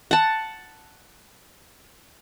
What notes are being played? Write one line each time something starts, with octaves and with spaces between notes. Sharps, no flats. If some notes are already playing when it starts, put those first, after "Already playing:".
F#5 A5